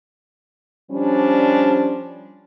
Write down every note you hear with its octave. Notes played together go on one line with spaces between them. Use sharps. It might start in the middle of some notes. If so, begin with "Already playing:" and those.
F3 G3 C#4 D4